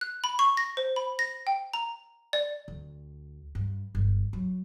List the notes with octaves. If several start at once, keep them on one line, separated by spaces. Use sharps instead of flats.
F#6
B5
C#6
A#6
C5
B5
A#6
G5
A#5
D5
D2
G2
G1
F#3